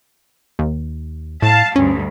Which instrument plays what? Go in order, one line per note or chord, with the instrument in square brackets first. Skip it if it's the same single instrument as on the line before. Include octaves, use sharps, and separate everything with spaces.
[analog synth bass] D#2
[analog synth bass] A2 [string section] F5 A5
[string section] D2 G2 [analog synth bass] C#4